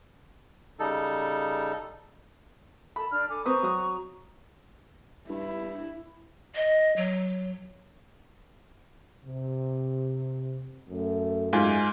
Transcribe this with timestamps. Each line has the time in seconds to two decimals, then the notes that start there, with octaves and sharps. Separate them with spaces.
0.79 C#3 G3 D#4 A4
2.96 A4 A5 B5
3.11 D4 D5 F6
3.28 A4 G#5 D6
3.46 C4 B4 A#5 C#6 D#6
3.63 F#3 D#6
5.29 G2 E4
6.55 D#5
6.96 F#3
9.24 C3
10.89 F#2 A3
11.53 G#2 F4 G#5